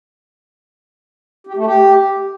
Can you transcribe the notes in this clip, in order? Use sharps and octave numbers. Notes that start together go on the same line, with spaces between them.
G4
A3
G4